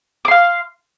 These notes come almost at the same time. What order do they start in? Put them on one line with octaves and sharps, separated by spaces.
D6 C6 F5